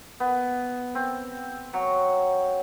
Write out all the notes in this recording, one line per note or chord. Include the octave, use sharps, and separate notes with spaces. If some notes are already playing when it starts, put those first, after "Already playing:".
B3
C4
F#3